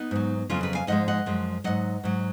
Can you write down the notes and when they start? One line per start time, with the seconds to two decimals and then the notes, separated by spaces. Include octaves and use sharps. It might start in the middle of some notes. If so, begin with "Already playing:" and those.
Already playing: B3 D#4
0.11 G#2 F#3
0.50 F2 C#3 F#3 C#4 F4
0.63 G#4 B4
0.75 F5 G#5
0.87 G#2 F3 G#3 D#5 F#5
1.08 D#5 F#5
1.26 F#2 F3 G#3
1.64 G#2 F#3 D#5 F#5
2.04 G#2 F#3